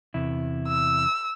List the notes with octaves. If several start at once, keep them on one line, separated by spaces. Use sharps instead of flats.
E2 C3 E4
E6